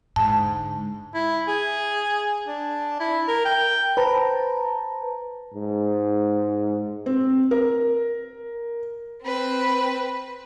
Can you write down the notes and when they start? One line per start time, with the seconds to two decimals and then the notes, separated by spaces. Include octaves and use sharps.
0.16 G#2 D3 A5
1.14 E4
1.48 G#4
2.47 D4
3.00 E4
3.28 A#4
3.45 G5
3.97 B4 C5 A5 A#5
5.54 G#2
7.06 C4
7.51 A#4
9.22 C4 B4